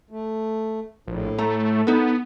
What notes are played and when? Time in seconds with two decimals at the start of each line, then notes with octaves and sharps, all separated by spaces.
0.11 A3
1.07 A#1 A2
1.38 A3 A#5
1.87 B3 D#4 A4